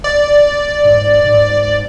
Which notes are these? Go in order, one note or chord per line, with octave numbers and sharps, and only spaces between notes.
D5
G#2
G#2